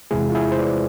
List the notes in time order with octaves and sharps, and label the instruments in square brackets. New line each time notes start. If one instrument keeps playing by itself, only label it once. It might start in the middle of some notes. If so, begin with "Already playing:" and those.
[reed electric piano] E2 C3 G#3 E4 G#4
F4
E4 G#4
C5
B4 D5